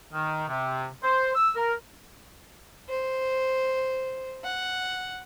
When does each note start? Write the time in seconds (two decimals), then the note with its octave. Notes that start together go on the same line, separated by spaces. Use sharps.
0.13 D#3
0.48 C3
1.02 C5
1.35 E6
1.56 A#4
2.89 C5
4.44 F#5